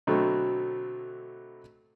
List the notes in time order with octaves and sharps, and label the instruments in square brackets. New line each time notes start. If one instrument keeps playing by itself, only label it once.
[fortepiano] B2 D3 F#3 A3 C4